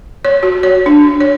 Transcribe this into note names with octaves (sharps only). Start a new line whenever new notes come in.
C#5
F#4
C#5
D4
C#5